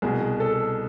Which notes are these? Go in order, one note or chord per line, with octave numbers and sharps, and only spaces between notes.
C2 B2 G#4
A4